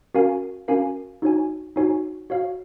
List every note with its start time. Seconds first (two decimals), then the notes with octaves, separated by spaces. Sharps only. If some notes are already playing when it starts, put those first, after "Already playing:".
0.14 C#4 F#4 A#4 F5 G#5
0.68 C#4 F#4 A#4 F5 G#5
1.22 D#4 F#4 C#5 G#5
1.76 D#4 F#4 C#5 G#5
2.30 F#4 C#5 F5